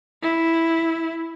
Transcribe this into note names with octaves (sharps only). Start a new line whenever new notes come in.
E4